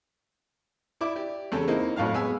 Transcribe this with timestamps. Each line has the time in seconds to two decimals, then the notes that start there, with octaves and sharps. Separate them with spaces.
1.01 E4 D5 E5 D6
1.16 G4 D5
1.52 E2 C#3 C#4 A4
1.68 A#3 C4 D#4 E4
1.96 F2 A2 F#3 F5 F6
2.14 G#3 B3 G#5 E6